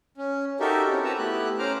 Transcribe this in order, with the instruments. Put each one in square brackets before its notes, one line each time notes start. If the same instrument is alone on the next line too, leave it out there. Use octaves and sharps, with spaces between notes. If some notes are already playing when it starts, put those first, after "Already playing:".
[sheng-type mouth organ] C#4
D#4 F#4 G4 A4 A#4 E5
C4 C#4 E4
F#4 G4 B4 A5 A#5 E6
A3 B3 E4 G4 F#6
C#4 C5 A#5 D6 F6